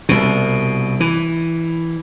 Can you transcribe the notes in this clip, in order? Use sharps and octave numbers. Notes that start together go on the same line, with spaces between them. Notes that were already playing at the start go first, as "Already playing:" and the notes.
C2 B2
E3